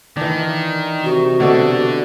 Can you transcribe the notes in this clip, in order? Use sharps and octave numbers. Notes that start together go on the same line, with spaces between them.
D#3 E3 D4
C3 F#4
B2 D3 A4 D5